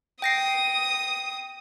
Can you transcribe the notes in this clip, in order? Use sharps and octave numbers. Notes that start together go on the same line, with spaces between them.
G5 D#6 A#6 C7